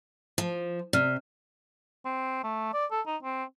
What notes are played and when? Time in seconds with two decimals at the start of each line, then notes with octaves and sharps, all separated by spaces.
0.38 F3
0.93 C3 D5 F6
2.05 C4
2.44 A3
2.74 D5
2.91 A4
3.07 D#4
3.23 C4